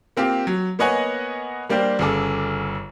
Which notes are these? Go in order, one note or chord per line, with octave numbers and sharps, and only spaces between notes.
A#3 C4 F4 G4
F#3
A#3 B3 C#5 D#5 F#5 G#5
G3 A#3 D4 G4 C5
G1 C#3 G#4 A4 D6